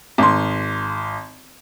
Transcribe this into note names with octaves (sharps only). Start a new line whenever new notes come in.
G#1 C6